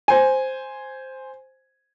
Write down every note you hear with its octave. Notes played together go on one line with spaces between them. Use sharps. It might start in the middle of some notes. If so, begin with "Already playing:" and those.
C5 G#5